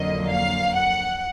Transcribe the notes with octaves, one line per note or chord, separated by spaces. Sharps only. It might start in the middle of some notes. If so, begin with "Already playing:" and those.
Already playing: F2 D3 F#3 A#3 D#5
F5
F#5